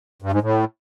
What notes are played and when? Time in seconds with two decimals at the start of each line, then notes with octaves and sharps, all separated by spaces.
0.22 G2
0.32 G#2
0.42 A2